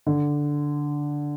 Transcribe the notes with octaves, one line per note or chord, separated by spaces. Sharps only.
D3